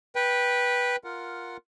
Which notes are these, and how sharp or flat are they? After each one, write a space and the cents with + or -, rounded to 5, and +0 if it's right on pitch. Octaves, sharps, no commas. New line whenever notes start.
B4 -10 G5 +0
F4 +0 A#4 +0 F#5 +0